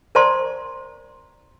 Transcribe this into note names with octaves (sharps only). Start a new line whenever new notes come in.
A#4 C5 D5 A5 A#5 C6